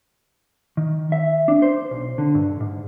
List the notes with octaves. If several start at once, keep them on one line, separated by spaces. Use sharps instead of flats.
D#3
E5
D4
C5
B1
D3
G2
G#2